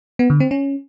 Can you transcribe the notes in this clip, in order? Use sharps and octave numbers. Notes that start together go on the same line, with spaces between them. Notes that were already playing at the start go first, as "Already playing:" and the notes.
B3
D3
C4
C#4